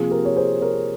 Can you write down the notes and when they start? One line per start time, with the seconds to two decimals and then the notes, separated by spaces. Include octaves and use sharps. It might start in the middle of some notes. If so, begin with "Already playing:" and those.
Already playing: C3 F3 A#3 F4 G#4
0.10 G4 A#4
0.25 C#5
0.36 G#4 C5
0.61 A#4 C#5